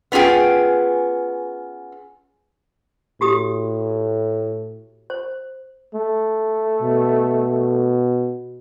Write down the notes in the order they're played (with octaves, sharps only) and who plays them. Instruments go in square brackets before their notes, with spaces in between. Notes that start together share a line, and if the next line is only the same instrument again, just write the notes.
[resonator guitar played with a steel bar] B3 C#4 F4 G#4 G5
[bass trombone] A2 [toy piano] F#4 G4 D#6
[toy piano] C5
[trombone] A3
[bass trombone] B2